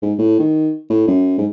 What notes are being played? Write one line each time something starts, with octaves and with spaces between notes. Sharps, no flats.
G#2
A2
D#3
A2
F#2
G#2